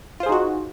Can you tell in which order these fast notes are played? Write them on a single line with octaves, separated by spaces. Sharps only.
F4 C5 G#4 D#4 F#4